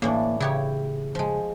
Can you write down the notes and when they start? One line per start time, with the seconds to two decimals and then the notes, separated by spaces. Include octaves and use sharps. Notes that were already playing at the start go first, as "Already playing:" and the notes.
0.02 A2 E3 A#3 D4
0.40 C#3 E4 G4 C#5
1.15 F3 G#3